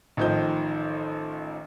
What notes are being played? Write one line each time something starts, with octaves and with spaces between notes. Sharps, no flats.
A1 D#3 F3 D#4 G6